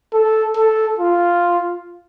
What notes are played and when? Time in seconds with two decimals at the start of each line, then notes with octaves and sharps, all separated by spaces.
0.14 A4
0.57 A4
0.99 F4